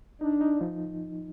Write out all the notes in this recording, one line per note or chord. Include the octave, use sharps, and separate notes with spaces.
D4 D#4
D#4
F3